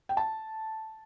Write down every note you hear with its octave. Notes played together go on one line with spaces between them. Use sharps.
G5
A5